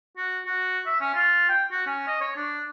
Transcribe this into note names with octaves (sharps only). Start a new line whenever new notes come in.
F#4
F#4
E5
C#4
F4
G5
F#4
C#4
D#5
C#5
D4